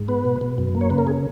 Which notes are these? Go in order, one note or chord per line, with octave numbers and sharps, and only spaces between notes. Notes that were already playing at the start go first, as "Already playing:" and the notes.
Already playing: G#2
B3 B4
B2
B2
F#2
A#3
C#5
C#3 B4
A#4
G#4